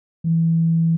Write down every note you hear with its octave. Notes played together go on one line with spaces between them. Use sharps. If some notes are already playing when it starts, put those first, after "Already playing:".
E3